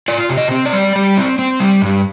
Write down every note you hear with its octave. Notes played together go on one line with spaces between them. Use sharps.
F4 D5
C3
D#5
C4
D5
G3
G3
C4
C4
G3
G2